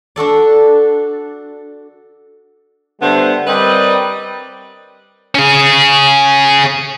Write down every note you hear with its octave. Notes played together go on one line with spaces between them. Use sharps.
D4 F#4 A4 D5
D3 G3 A3 B3 C5
G3 C4 A#4 B4 D5 D#5
C#4 G#4